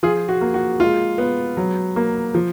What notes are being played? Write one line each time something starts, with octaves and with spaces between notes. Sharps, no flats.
F3 F4 G#4
F#4
A#3
F#4
G#3 F4
B3
F#3
A#3
F3